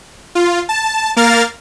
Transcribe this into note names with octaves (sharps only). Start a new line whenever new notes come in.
F4
A5
A#3 A#4 F5 F6 A6